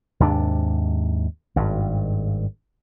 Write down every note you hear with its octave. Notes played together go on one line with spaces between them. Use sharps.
D#2 G#2 C3 D4
G#1 G2